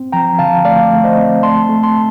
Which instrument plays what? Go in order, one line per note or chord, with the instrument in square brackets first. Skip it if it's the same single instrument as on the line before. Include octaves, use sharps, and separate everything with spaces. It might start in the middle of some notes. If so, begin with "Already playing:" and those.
Already playing: [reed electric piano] C4
F3 G5 A#5
D3 F5 A5
A3 D5 F5
A3
C5 D#5
C4
A3 A5 C6
A3
A5 C6